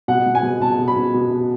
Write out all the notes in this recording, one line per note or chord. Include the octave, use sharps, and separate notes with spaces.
B2 F#5
B2
G#5
B2
B2 A5
B2
B5
B2
B2
B2